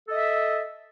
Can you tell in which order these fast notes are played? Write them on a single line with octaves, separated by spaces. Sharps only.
A4 D#5 E5